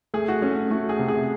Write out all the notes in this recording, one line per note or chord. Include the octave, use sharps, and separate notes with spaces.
A3 G#4
F#4
A3 C#4
A3 F#4
G#4
C3
G#4